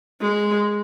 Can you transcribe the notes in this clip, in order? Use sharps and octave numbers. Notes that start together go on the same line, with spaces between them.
G#3